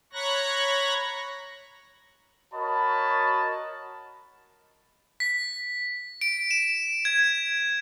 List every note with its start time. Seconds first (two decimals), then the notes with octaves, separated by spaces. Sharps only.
0.13 C#5 A#5 B5 C#6 F#6 A#6
2.53 F#4 A#4 C#5 D#5 A5 B5
5.20 B6
6.21 D7
6.51 E7
7.05 G#6